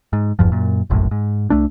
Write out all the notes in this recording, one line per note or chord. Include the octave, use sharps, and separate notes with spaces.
G#2
F#1 E2 G2 F3
F#2 A#2
F1 A#1 F#2 A2
G#2
C2 A3 D4